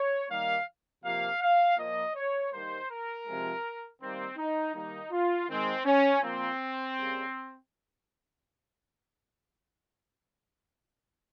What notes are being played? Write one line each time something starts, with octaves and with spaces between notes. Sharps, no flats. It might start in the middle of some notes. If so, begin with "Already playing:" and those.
Already playing: C#5
D#3 G3 A#3 F5
C3 F3 A#3 F5
F5
A#2 F3 A#3 D#5
C#5
D#3 G3 A#3 C5
A#4
C3 F3 G#3
D#3 G3 A#3 C4
D#4
D#3 G3 A#3 D#4
F4
D#3 G#3 C4
C#4
A#2 F3 A#3 C4
C#3 G3 A#3